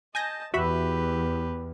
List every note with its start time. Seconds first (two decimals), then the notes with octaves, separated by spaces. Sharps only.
0.15 D#5 G#5 A5 G6 A#6
0.54 E2 F#4 G4 B4 E5 B5